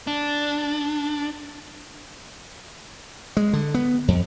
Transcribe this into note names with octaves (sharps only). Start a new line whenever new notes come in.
D4
G#3
D3
B3
F2